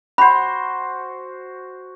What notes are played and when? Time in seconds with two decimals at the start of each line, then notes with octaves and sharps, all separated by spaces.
0.18 F#4 C5 B5